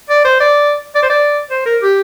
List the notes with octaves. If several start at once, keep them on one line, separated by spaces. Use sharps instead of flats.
D5
C5
D5
D5
C5
D5
C5
A#4
G4